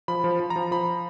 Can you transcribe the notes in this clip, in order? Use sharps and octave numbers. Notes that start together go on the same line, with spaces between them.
F3 B5
F3
F3
A#5
F3
F3 B5